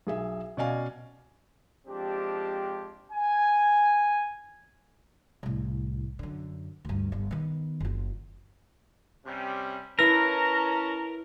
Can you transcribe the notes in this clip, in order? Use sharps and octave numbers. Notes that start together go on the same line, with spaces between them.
B1 G#4 E5
B2 C#4 D5 D#5 F5 G#5
F3 G#3 C4 D4 G4
G#5
C2 A2
F#2 D3
D2 G2
G1
D#3 B3
F#1 F4
C3 G3 C#4
C#4 E4 A#4 B4 A5 A#5 A#6